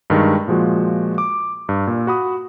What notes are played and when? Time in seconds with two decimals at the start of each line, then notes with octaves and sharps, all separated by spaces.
0.10 G2 D#3 G#3
0.48 A#2 F3 G#3 F#4
1.18 D6
1.69 G2
1.87 A#2
2.07 F#4 B5 D#6